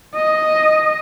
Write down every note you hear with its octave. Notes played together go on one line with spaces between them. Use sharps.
D#5